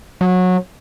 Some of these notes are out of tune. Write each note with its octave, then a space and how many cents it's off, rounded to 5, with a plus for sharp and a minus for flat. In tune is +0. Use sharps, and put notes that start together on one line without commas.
F#3 -20